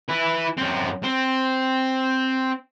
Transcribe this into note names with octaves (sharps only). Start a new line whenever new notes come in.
E4 B4
F#2 C4
C4